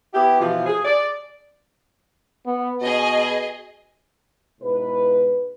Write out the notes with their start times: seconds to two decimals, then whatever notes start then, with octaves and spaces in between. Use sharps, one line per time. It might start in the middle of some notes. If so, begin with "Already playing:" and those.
0.13 B3 E4 G4
0.41 B2 E3 F3
0.66 G#4
0.85 D5
2.46 B3
2.82 B2 G#4 D#5
4.61 G#2 B2 E4 B4